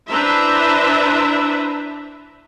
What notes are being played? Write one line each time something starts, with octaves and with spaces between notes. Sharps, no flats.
D4 E4 B4 C5 E5 A#5